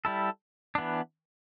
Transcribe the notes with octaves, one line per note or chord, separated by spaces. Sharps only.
G3 E4 A4
E3 B3 D4